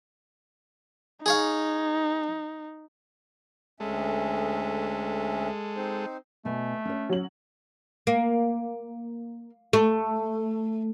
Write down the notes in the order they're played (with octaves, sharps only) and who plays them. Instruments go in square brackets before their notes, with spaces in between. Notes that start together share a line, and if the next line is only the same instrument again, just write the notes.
[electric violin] D#4 [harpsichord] G#4 C#5 F5
[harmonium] D2 C#4 E5 [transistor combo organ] G#3 A4
[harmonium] C4 D#4 C5
[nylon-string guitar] B2 G#5 [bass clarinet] A3
[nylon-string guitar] C#4 C#5
[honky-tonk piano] F#3 F#7
[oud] A#3
A3